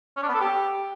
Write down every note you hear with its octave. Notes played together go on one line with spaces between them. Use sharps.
C#4
D4
B3
A4
G4